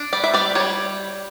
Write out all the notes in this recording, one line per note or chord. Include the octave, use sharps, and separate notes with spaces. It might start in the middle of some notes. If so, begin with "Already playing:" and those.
Already playing: D4
G3 D5
E5
G3 D5
G3 C#5